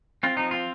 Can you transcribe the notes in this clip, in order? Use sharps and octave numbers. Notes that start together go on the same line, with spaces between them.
C4 F4
F3 D#4
C4 F4